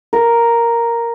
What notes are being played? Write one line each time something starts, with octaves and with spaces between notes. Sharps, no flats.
A#4